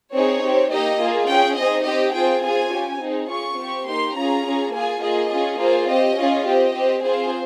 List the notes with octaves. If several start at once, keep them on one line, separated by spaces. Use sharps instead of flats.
C4 D#4 G#4 C#5
C4 G4
A#3 D#4 G4 D#5
A#3 F4 G#4
C#4 G#4 G5
C4 D#4 G#4 D#5
C4 G4 D#5
C4 F4 G#4 G5
C4 F4 G#4 G#5
C#4 G4
C4 D#4 G#4
C#4 F4 G#4 C#6
C4 G4
A#3 D#4 G4 C6
C#4 F4 G#4 A#5
C#4 F4 G#4
A#3 F4 G#4 G#5
A#3 F4 G#4 D#5
C#4 F4 G#4
A#3 F4 G#4 C5
C4 G4 D#5
C#4 F4 G#4
C4 G4 D#5
C4 G4
C4 F4 G#4 C5